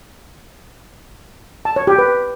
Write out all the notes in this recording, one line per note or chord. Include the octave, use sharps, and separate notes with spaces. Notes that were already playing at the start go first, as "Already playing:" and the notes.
A5
C#5
G4
B4